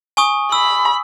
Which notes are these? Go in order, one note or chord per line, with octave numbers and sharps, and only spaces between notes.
G#5 C#6 D#6
B5 E6